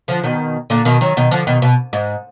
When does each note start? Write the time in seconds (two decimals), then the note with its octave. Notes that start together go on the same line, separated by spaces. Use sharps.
0.08 D3 F3
0.23 B2 D#3
0.70 A#2 D3
0.85 B2 D#3
1.01 D#3 F#3
1.17 B2 D#3
1.31 D3 F3
1.47 B2 D#3
1.62 B2
1.93 G#2